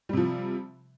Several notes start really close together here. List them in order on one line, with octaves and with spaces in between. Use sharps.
G3 C3 F3